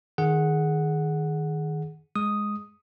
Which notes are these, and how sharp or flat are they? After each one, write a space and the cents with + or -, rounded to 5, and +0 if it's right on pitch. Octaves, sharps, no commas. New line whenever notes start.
D#3 +0 G#4 +10 F#5 -5
G#3 +0 D#6 +0